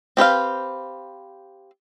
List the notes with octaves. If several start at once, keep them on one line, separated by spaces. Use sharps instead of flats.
C4 G4 B4 F5